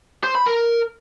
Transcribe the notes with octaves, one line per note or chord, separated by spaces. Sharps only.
C5
B5
A#4